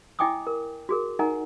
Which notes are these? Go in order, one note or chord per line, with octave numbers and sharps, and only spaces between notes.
E4 D#5 G5 G#5 D6 D#6
A#4
F#4 G#4 A#4
D#4 A#4 D#5 F#5 G#5 A#5